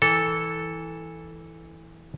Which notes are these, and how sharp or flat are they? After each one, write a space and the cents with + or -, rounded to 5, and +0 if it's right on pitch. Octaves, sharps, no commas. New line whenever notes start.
E3 -10 A4 +0